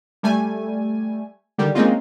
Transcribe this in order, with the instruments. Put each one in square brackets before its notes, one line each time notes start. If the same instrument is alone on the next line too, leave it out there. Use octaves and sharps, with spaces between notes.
[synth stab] G3 A3 G#5
D3 D#3 G3
G#3 A#3 C4 C#4 D#4 F4